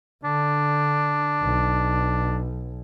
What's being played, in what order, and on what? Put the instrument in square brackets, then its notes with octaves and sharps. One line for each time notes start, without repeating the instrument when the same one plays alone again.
[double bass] D3 [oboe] D4
[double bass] B1